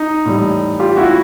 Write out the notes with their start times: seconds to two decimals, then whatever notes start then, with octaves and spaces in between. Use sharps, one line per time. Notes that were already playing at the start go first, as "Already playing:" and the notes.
Already playing: D#4
0.26 A2 E3 G3
0.79 F4 G4
0.97 E4 F#4